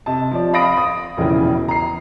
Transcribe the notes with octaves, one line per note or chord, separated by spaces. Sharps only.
C3 D#5 A5
F3 D5
F5 B5 D#6 A#6 D7
D#6
E1 A#1 C#3 E3
A#5 C7